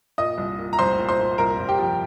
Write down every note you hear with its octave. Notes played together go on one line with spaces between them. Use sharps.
A#2 D#5 D#6
C2
A#2
A#5
C2 C5 C6
A#2
C5 C6
A#2
C2 A#4 A#5
C2
G4 G5
F3